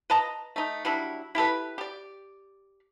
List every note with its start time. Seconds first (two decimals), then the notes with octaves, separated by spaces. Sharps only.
0.10 B4 D#5 A5 A#5
0.56 A3 D#4
0.85 F#3 G3 D4 E4
1.35 E4 G4 A4 B4
1.78 G4 D5